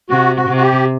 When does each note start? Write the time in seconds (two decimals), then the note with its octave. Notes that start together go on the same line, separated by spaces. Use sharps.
0.10 C3 F#4
0.36 F#4
0.50 C3
0.56 F#4
0.62 G4